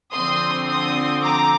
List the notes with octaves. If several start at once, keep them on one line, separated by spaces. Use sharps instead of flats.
D3 F3 C4 C6 D#6
C6 D#6
A#5 D6